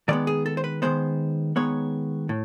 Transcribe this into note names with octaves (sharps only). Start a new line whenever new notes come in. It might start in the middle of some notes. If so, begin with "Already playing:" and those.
D#3 G#3 B3 D5
G#4
A4
C5
B4
D#3 G#3 B3 C5
D#3 G#3 B3 C#5
A2